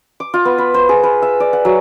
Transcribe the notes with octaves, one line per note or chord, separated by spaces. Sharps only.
D6
F4
B3
B5
C5
G#4
B4
E5
D5
F#5
F#3